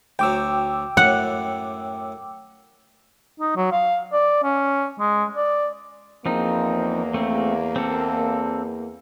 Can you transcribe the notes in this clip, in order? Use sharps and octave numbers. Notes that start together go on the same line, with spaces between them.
D2 F#3 G5 D6 E6
F#2 A2 F#5
D#4
F#3
F5
D5
C#4
G#3
D5
E2 F3 A#3 C4 D#4
A3 C4
C4 A4